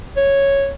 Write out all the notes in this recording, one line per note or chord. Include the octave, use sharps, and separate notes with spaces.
C#5